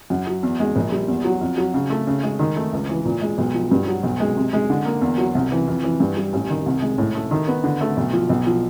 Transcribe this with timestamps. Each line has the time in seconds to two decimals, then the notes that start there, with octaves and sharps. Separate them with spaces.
0.10 F#2
0.27 F#3
0.43 E2
0.60 G#3
0.76 A#1
0.92 G3
1.08 E2
1.25 F#3
1.41 F2
1.58 F#3
1.74 C#3
1.90 A3
2.07 C#3
2.23 G#3
2.39 D#3
2.57 A3
2.73 C#2
2.89 E3
3.05 A#2
3.22 G#3
3.38 B1
3.54 F3
3.71 G2
3.87 F#3
4.03 B1
4.20 G#3
4.37 C3
4.53 G#3
4.70 D3
4.85 A#3
5.01 E2
5.18 F#3
5.35 C2
5.52 E3
5.67 F2
5.83 E3
6.00 G2
6.17 G3
6.33 A1
6.50 D#3
6.66 C2
6.82 G#3
6.98 A2
7.15 A3
7.31 D#3
7.48 B3
7.64 D3
7.81 A3
7.97 B1
8.13 F3
8.29 B1
8.47 F3